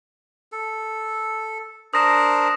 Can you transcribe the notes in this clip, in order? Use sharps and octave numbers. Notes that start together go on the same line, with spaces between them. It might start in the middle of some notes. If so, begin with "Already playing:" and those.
A4
D4 A#4 C5 D#6 A#6 E7